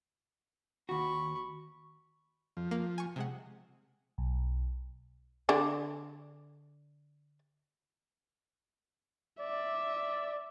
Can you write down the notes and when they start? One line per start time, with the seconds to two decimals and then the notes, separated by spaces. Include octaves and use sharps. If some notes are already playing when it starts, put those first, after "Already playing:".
0.89 D#2 F#4 B5 C#6
2.57 F2 F3
2.71 A#3
2.98 G#5 C#6
3.16 C3 G#3 F#5
4.18 B1
5.49 D3 D4
9.40 D5 E5